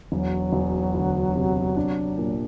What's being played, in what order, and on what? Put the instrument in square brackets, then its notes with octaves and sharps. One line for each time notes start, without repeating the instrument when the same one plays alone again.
[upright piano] E1 [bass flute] F#3
[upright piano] E1
D2
C3
D4
A#2